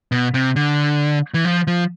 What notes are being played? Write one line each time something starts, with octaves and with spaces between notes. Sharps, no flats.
B2
C3
D3
E3
F3
F3